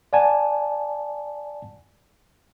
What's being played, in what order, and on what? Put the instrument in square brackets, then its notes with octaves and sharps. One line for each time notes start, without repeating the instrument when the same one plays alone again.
[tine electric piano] D5 F#5 G#5 A5